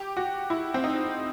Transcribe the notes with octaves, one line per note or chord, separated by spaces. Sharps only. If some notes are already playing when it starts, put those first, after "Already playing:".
Already playing: G4
F#4
E4
C4
D#4